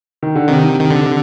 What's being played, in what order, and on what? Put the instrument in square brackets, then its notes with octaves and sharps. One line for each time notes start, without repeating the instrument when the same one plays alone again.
[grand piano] D#3
D3
[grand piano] C3 [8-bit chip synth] D#3
[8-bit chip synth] D#3
D3